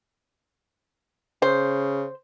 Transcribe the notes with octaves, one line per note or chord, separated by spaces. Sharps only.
C#3 C5